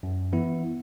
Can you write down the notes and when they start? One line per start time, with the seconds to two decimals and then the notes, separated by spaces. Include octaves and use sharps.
0.03 F#2
0.33 E3 B3 E4